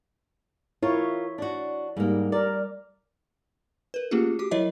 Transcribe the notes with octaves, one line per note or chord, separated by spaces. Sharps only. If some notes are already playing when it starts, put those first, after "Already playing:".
E4 F4 A#4 C#5
D4 F#4
G#2 G3 A#3
A#4 D5
A#4 B4
A3 A#3 C#4 F4 G4 G#4
F#4 G4 D6
F#3 E4 A#4 C#5 D#5 E5